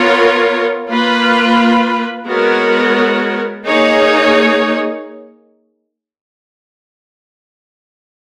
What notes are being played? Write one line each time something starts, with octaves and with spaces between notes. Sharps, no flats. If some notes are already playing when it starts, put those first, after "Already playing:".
Already playing: B3 F4 A#4 C#5
A#3 F4 B4
G#3 B3 F#4 A#4 C#5
A#3 D#4 G#4 C#5